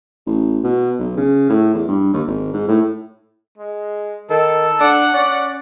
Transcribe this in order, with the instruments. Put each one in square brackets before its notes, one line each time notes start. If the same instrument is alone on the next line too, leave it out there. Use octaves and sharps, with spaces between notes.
[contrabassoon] A1
B2
B1
C#3
A2
E2
G2
D#2
G#1
G#2
A2
[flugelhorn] G#3
[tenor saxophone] D#3 [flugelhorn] A4
[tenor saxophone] D4 [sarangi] F#5
[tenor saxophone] C#4 [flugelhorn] D5